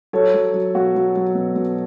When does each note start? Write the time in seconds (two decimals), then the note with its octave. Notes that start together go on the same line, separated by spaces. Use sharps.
0.13 F#3 A4 C#5
0.34 F#3
0.54 F#3
0.75 B2 F#4
0.95 F#3
1.16 F#3
1.35 B2
1.56 B2